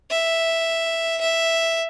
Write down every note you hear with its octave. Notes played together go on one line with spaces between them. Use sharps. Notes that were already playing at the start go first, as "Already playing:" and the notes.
E5
E5